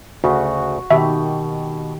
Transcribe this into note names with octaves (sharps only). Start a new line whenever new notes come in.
D2 C#3 F#4
B2 D#3 G4 E5